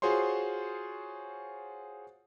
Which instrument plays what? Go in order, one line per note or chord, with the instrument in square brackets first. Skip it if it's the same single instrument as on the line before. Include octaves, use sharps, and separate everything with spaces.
[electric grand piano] F4 F#4 G#4 C5 C#5 C6